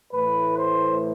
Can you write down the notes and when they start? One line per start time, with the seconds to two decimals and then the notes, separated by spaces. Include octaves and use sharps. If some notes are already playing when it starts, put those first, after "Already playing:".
0.13 A2 E3 A3 B4
0.57 C5